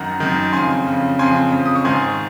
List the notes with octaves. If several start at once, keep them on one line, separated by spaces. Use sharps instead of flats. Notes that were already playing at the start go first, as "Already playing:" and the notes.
Already playing: F#2 D#3 F#5 A#5
F#2 D#3
F2 C#3 G#5 C6
F2 C#3
F2 C#3 G#5 C6
F2 C#3
D#6
C#6
G#2 D#3 G#5 C6